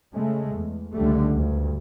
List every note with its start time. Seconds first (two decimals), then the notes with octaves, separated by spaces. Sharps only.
0.13 C#3 G#3 A3
0.52 E2
0.93 C#2 D3 G3 A3
1.35 D2 G2